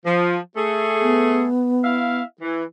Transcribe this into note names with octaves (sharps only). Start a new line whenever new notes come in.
F3
A3 G#4
B3
E4 E5 F5
E3